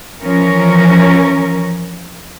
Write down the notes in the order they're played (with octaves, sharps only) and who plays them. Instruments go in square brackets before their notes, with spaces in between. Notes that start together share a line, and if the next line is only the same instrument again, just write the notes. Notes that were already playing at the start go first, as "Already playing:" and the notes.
[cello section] E3 F3 C#4 A#4